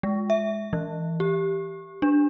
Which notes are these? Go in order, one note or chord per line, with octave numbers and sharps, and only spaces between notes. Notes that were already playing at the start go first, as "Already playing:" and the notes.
G#3
E5
E3
G4
D4